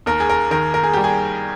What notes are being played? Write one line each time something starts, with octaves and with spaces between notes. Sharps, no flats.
D#2 A#4
G#4
A#4
D#3 A#4
A#4
G#4
G3 G4
G#4